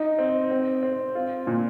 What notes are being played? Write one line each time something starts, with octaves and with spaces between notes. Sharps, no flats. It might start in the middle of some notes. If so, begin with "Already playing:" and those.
Already playing: D#4
C4
C4
C4
F4
A#2